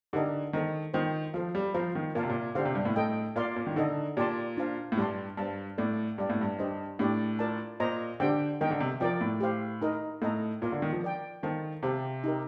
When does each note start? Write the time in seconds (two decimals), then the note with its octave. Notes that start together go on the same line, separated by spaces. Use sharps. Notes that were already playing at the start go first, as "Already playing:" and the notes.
0.13 D3 D#4 G4 A#4 D#5 A5
0.53 D#3 A4 C5 D#5 A#5
0.94 D#3 F4 C5 D#5 G5
1.34 F3 A4 C5 F5
1.55 G3
1.74 F3 C5 F5 A#5
1.95 D#3
2.15 A#2 A#4 F5 A5
2.23 C3
2.30 A#2
2.55 D3 D4 G4 C5 F5
2.65 C3
2.75 G2
2.85 A2
2.95 A2 A4 D#5 G5
3.36 A#2 A#4 D5 F5 C6
3.56 A#2
3.67 D#3
3.76 D3 D#4 A4 D#5
4.17 A#2 G4 D5 A5 C6
4.57 D4 F4 C5 F5 A5
4.92 A2
4.97 G2 G4 D5 A5 C6
5.37 G2 C5 F5 A5
5.78 A2 A4 D5 F5
6.18 G2 G4 D5 F5
6.30 A2
6.41 G2
6.59 D4 G4 C5 D#5
6.99 A2 D4 G4 D5
7.39 F4 A#4 D5 A5
7.80 A#2 C5 D#5 A#5
8.20 D3 D4 G4 C5 G5
8.61 D#3 A#4 D#5 G5
8.71 D3
8.80 C3
9.00 F3 A#4 D5 G5
9.21 A2
9.41 G4 C5 F5
9.82 D#4 A#4 D#5
10.22 A2 A4 D#5 A#5
10.62 A#2 F4 A#4 D5 F5 A#5
10.72 D3
10.82 D#3
10.92 F3
11.03 A#4 D5 G5
11.43 D#3 A4 C5 F5 A5
11.83 C3 G4 C5 F5 A5
12.24 D#4 G4 A#4